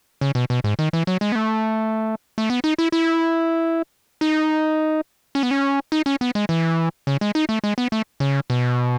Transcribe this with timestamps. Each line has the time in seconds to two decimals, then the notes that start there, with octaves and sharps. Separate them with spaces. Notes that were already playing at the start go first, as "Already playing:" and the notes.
0.21 C#3
0.35 B2
0.50 B2
0.64 G#2
0.79 D#3
0.93 E3
1.07 F#3
1.21 G#3
1.32 B3
1.35 A3
2.38 A3
2.50 B3
2.64 D#4
2.78 E4
2.92 E4
4.21 D#4
5.35 C#4
5.43 B3
5.51 C#4
5.92 D#4
6.06 C#4
6.21 B3
6.35 G#3
6.49 E3
7.07 C#3
7.21 G#3
7.35 D#4
7.49 A3
7.64 G#3
7.78 B3
7.92 A3
8.20 C#3
8.50 B2